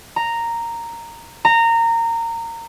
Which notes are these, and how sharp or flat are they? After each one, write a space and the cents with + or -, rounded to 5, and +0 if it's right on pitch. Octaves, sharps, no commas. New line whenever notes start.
A#5 -5
A#5 -20